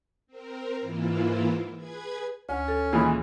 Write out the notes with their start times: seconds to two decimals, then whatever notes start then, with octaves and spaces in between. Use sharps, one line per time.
0.27 C4 A#4
0.81 G#2 E3 A#3 E4 F4
1.77 G#4 B4 G#6
2.49 D2 C#4
2.68 A4
2.93 A#2 D#3 E3 G#3 G#4